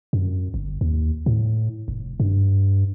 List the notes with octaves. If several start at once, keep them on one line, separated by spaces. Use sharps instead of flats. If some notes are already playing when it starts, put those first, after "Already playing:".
F#2
G1
D#2
A2
F1
G2